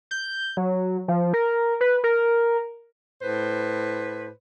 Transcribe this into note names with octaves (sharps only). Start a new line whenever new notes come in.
G6
F#3
F3
A#4
B4
A#4
A2 B4 C5